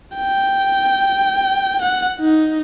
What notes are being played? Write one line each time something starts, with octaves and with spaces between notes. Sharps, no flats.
G5
F#5
D#4